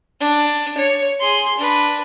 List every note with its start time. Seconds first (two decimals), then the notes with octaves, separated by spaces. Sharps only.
0.20 D4
0.78 C#5
1.20 G#4 C6
1.58 D4 B4